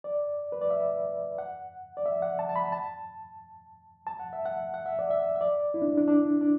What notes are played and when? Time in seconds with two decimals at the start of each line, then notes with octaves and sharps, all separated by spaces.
0.04 D5
0.52 B4
0.61 D5
0.70 E5
1.38 F#5
1.97 D5
2.06 E5
2.22 F#5
2.39 A5
2.49 A5
2.56 B5
2.72 A5
4.07 A5
4.19 F#5
4.33 E5
4.45 F#5
4.74 F#5
4.86 E5
4.99 D5
5.11 E5
5.36 E5
5.41 D5
5.74 E4
5.82 D4
5.98 D4
6.08 D4
6.41 D4